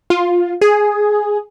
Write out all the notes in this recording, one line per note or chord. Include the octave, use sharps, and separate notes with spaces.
F4
G#4